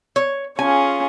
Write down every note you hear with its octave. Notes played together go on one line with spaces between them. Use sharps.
C#5
C#4 F4 G#4 G#5